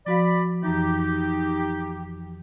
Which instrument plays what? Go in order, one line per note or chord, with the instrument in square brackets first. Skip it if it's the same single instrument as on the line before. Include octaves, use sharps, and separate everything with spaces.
[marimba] F3 F#4 F5 [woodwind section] D5 B5
[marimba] F2 E3 [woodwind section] D#4 G4